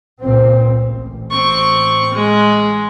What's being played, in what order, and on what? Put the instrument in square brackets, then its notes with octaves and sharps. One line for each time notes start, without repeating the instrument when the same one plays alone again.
[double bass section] C#2 A#2 C4
A1
[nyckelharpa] C4 C#6
G#3